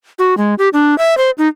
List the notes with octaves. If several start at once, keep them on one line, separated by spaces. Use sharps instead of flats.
F#4
G#3
G4
D4
E5
C5
D#4